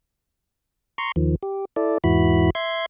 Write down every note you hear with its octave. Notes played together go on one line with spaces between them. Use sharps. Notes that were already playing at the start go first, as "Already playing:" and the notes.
A#5 C6 C#6
D#2 D#3 F3
G4
E4 A4 D5
E2 G#2 E3 E4 F#4 B5
E5 C6 G#6